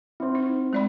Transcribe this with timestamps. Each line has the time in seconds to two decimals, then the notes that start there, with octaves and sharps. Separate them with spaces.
0.20 C4 E4 C5 C6
0.35 D#4
0.73 G#3 A3 D5 B5